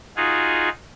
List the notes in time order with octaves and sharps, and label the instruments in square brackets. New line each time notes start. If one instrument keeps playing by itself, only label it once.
[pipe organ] D#4 F4 F#4 G#4